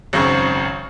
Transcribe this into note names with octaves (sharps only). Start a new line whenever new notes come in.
G#1 F#2 C#3 C4 C#6